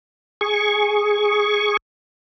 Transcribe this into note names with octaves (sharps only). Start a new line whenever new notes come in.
G#4 C#6